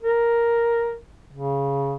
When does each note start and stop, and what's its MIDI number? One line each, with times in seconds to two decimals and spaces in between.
0.03 0.96 70
1.33 1.96 49